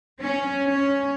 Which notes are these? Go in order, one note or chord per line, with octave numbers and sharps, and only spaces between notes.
C#4
C#4